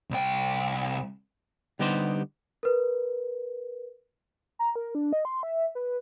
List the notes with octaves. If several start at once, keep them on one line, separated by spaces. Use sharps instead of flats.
C2 G5
D3 G3 B3 D#4 G4 C5
A#4 B4
A#5
A#4
D4
D#5
C6
E5
B4